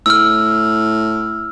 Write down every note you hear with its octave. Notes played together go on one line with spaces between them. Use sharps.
A2 E6 F6